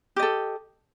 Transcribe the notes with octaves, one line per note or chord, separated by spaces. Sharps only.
G4 A4 D#5